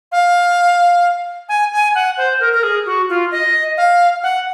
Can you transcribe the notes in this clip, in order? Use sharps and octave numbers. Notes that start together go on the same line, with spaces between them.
F5
G#5
G#5
F#5
C5
A#4
A#4
G#4
F#4
F4
D#5
F5
F#5